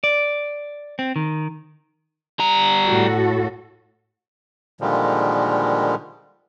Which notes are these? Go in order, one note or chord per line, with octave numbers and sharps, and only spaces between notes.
D5
C4
D#3
G3 A#5
A2 F#4 A4
A#2 D3 D#3 F3 G3 G#3